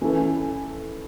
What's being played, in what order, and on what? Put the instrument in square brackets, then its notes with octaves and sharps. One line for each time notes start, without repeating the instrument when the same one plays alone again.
[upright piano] E3 C#4 E4 A4